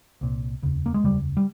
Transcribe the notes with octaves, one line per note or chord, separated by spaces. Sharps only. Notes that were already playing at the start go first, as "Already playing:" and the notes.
C2 A#2
F1 D#2 C#3
A#3
G#3
F1 D#2 C#3 G3
G3